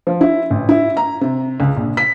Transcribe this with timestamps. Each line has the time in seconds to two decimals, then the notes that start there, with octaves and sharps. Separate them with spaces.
0.07 F3
0.21 E4
0.51 A1
0.69 E4
0.97 A#5
1.21 C3
1.60 C#2
1.77 A#1
1.97 B6